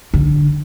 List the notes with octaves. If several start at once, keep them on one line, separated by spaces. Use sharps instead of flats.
D3